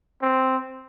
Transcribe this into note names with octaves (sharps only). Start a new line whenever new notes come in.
C4